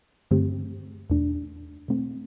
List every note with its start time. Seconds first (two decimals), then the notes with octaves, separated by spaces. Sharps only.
0.31 G2 D3 A3 C4 G4
1.10 E2 B2 A3 D4
1.88 B2 A3 C4